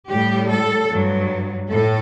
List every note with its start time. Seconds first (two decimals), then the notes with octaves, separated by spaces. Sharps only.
0.10 A2 G3 G4
0.50 A4
0.91 G2 F#3
1.71 A2 A4